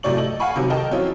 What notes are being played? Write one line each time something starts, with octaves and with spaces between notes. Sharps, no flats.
A2 C3 F#3 D5 C#6 F#7
A4 D#5 F#7
F5 F#5 G#5 B5 C#6
C3 D#3 F#3
A#4 D#5 G5 A5
F3 F#3 C4 C#4 E4 F4